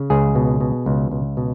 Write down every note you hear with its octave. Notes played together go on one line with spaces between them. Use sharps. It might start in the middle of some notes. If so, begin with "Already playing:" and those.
Already playing: C#3
C#2 G#4
B2
B2
C#2
C#2
B2